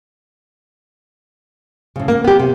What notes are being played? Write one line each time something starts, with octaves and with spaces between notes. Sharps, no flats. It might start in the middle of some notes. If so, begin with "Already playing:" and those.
A2 C#3
A#3
B3 G4
C3